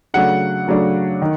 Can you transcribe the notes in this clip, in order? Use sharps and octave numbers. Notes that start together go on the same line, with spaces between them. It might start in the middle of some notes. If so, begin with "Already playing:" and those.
C#3 F#3 A3 D4 F#5
C#3 F#3 A3 D4
D#3